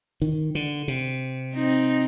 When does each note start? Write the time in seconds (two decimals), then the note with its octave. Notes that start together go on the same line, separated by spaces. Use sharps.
0.22 D#3
0.55 D3
0.88 C3
1.55 C4 D#4